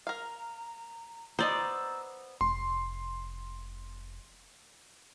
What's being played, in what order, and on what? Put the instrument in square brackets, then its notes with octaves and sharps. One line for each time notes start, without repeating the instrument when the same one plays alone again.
[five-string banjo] A#4 F5 [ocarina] A#5
[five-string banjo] B3 D#4 [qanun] C5 D5 [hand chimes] A#5 [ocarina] E6
[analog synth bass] F1 [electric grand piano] C6